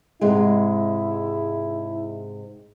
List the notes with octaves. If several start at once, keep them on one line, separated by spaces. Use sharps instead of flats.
G#2 C3 G#3 E4